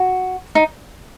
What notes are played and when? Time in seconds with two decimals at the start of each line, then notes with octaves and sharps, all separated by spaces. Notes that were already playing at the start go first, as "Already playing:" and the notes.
Already playing: F#4
0.55 D#4